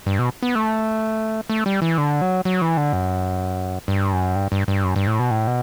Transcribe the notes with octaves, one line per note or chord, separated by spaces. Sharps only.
G2
B2
B3
A3
A3
G3
E3
D3
F#3
F#3
E3
D3
F#2
G2
F#2
G2
G2
G2
F#2
G2
A2
B2
A2
B2